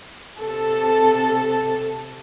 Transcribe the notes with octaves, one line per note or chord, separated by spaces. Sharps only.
C3 A4